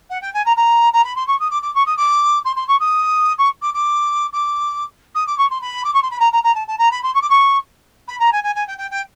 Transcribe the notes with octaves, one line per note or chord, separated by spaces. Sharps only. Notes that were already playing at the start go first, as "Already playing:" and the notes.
F#5
G5
G#5
A#5
A#5
A#5
B5
C6
C#6
D#6
D6
D6
C#6
D#6
D6
C6
C6
C#6
D#6
C#6
D6
D6
D6
D#6
D6
C#6
C6
B5
D6
C#6
C6
B5
A#5
A#5
A#5
A5
A5
A#5
B5
C6
C#6
D6
C#6
B5
A#5
G#5
G#5
G#5
G5
G5
G5